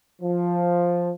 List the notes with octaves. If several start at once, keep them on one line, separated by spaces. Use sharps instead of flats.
F3